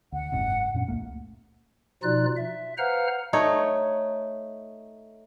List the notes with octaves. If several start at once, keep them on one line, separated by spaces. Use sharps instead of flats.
D2 F#5
F#1 G#2 C3
F#2 A#2 C#4
C#2 A3 A#3
B2 F3 D#4 F4 D5 F#6
E5
B4 C5 F5 F#5 A#5 F6
A3 D#4 C#5